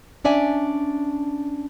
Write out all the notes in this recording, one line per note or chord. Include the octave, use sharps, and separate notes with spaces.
C#4 D4 D5 E5 G#5